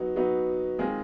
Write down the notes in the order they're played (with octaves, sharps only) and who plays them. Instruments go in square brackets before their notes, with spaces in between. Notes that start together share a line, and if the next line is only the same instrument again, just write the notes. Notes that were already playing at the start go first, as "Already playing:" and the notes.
Already playing: [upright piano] F#3 B3 D#4 F#4
F#3 B3 D#4 F#4
D#3 G#3 C4 F4 G#4